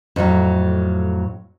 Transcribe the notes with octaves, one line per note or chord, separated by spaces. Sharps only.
F2 A2 E3 F#3